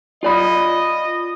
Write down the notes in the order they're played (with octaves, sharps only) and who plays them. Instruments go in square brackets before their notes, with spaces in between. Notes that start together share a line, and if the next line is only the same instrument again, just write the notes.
[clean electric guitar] F4 D5 B5 [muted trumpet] D#5